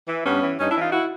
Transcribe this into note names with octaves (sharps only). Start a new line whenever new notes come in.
E3
G2 B3 C#4
E3
G2 C#4 D#4
D4 E4
E3
D#4 F4
E4 F#4